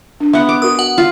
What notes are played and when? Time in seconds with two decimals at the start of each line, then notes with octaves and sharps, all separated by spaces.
0.20 D4
0.33 B3 E5 F#5
0.49 D6
0.62 F#4 A#4 D#6
0.79 F#5
0.98 F4